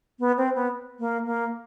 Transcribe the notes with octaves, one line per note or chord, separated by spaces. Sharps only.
B3
C4
B3
A#3
A#3